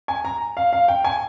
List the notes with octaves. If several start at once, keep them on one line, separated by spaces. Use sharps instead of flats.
G#5
A#5
F5
F5
G5
G#5